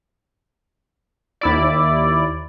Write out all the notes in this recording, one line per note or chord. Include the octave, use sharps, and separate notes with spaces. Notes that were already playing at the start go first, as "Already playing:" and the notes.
D#2 E4 D5